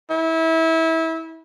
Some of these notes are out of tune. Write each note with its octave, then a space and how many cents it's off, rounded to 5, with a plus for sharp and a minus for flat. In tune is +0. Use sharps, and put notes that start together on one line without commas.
E4 -25